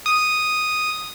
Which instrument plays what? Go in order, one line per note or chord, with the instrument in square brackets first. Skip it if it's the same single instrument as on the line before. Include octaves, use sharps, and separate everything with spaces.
[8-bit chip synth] D#6